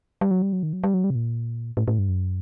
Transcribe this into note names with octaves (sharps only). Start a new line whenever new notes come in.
G3
F#3
G3
F#3
D#3
F#3
G3
F#3
G3
C3
A#2
A2
A2
G2
F#2